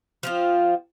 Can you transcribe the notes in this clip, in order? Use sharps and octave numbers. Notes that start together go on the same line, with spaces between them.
F3 C4 F4